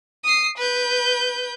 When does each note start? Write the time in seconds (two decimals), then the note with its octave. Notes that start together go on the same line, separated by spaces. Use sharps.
0.24 D#6 C7
0.58 B4 G6